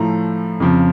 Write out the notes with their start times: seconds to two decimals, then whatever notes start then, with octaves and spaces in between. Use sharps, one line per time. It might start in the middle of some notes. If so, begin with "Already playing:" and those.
Already playing: A2 F3 A3 A#5
0.60 F2 C#3 F3